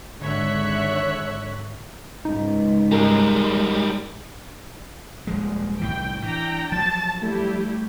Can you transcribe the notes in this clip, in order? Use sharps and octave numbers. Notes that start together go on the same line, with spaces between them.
G#1 D3 C#5 E5 F#6
C#2 G#2 D#4
G3 G#3 A#4
D#1 F3 G#3
C2 A2 E3 G5
E3 D4 G5 A#5
F3 F#3 A5 A6
G3 A3 E4 G4